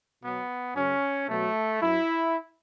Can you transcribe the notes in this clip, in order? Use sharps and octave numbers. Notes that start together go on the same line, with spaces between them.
B2 F#3 B3
F#2 C#3 F#3 C#4
B2 F#3 A3
F#2 F#3 E4